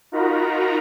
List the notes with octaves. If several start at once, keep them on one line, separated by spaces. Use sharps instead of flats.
D#4 F4 F#4 A#4 A#5 B5